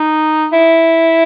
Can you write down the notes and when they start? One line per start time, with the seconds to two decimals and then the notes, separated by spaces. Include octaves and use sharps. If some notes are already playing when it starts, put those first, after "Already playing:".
Already playing: D#4
0.53 E4